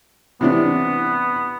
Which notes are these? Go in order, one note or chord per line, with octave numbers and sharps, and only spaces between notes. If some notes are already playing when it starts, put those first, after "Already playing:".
C3 E3 B3 D4